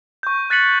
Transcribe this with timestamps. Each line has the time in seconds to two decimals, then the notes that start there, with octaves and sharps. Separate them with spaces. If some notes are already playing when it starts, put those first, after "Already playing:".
0.23 C#6 G6
0.50 F#6 A6 B6 C#7 F#7